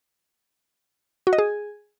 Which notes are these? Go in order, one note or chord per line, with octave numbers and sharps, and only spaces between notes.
F#4
D#5
G#4